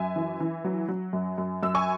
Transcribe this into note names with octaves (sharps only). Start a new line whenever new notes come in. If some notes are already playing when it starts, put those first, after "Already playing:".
Already playing: F#2 E5 G#5
E3
E3
F#3
F#3
F#2
F#2
F#2 E6
G#5 C#6